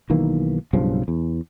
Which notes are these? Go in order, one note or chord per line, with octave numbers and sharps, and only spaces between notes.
B1 D#3 E3 A#3
B1 G2 C#3 F3
E2